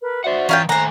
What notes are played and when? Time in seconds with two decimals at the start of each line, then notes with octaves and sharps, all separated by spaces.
0.01 A#4 B4
0.24 F#4 C5 D5 E5 F#5
0.49 E3 C#4 F4 G5 A#5
0.69 D#3 A3 C5 G#5 A#5 F#6